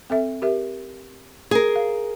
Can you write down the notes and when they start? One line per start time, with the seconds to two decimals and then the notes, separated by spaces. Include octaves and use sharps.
0.10 C4 A4 E5
0.42 G4 A#4 E5
1.51 G#4 A#4
1.76 F5